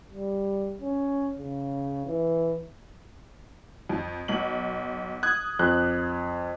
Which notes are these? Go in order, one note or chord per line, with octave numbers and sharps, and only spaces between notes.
G3
C#4
C#3
E3
F2
B1 F#7
D#6 F#6 G#6
F2 F#6